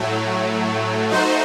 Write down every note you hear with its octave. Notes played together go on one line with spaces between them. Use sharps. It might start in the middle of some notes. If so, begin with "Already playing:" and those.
Already playing: A2 F#3 A3
A3 D#4 F#4 C5